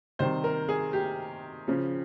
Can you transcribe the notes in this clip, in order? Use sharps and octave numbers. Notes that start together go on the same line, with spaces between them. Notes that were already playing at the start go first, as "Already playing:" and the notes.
C3 D#3 G3 C5
A#4
G#4
G4
C#3 F3